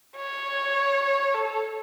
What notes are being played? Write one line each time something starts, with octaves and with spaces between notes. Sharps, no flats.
C#5
A4